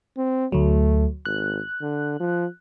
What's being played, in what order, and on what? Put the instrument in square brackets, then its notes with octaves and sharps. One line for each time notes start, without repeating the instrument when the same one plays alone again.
[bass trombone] C4
[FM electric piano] D2 F#3 [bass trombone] A3
[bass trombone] G#1 [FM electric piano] F#6
[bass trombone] D3
F3